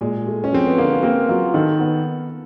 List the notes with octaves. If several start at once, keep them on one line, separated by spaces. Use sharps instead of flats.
A#2 G#3
A3
C#4
F3 C4
B3
D3 A#3
A#3 C4
F#3 F4
D#3 A4
B3